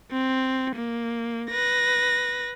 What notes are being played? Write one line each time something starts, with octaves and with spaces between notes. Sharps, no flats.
C4
A#3
B4 A#6